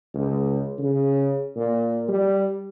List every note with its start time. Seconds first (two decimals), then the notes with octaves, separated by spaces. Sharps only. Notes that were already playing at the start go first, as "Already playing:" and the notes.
0.14 C#2
0.78 C#3
1.56 A#2
2.08 G3